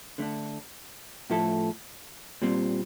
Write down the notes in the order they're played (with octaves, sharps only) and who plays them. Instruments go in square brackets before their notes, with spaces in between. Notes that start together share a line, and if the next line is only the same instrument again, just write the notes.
[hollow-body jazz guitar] D3 A3 D4
A2 F3 A3 E4 A4
A#2 G3 C4